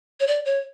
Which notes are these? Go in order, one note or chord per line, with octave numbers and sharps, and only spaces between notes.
C#5
D5
C#5